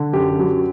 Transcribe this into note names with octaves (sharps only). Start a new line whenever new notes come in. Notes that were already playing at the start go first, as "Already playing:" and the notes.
Already playing: D3
F#2 G4
F#3